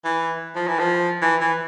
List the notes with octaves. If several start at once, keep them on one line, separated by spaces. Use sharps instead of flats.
E3
F3
E3
F3
E3
E3